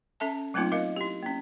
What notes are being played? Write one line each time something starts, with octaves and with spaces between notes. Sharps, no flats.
C#4 A4 E5 A5
F#3 A3 A#3 C4 D#4 F4
F4 A#4 D#5 F5
E4 G4
A#3 C#4